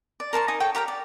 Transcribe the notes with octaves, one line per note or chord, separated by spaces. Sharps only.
D5
A#4 C5 A5 C#6
D#4 D#5 G#5 D#6
A4 C#5 G5
G4 A#4 F#5 G5
D5